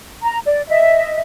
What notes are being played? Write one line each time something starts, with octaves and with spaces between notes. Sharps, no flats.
A#5
D5
D#5 E5